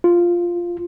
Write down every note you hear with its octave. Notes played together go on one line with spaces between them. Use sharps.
F4